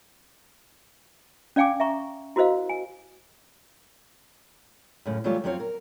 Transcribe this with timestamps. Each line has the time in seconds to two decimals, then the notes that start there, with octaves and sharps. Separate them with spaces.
1.56 C#4 D5 F5 G5 G#5 D6
1.80 E5 A#5 C#6
2.36 E4 F#4 A#4 C5 D#5 F5
2.69 G#5
5.06 F#2 A2 C#3
5.24 E3 F#3 G3 A3 F4 C#5
5.44 F2 F#3 C4 C#5 F5
5.60 A#4